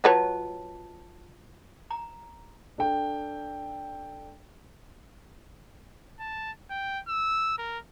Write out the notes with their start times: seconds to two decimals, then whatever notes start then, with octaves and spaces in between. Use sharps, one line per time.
0.04 F#3 F4 B4 C#5 D#5 A5
1.91 A#5
2.78 D4 A4 G5
6.20 A5
6.70 G5
7.08 E6
7.58 A#4